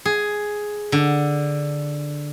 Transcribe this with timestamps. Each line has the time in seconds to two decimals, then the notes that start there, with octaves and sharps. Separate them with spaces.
0.05 G#4
0.92 D3